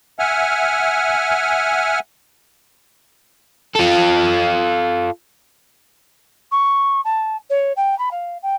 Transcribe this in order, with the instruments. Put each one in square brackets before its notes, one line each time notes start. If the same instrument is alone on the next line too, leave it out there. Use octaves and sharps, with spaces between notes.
[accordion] E5 F#5 G#5 F6
[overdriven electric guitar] F4 A4
[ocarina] C#6
A5
C#5
G5
B5
F5
G5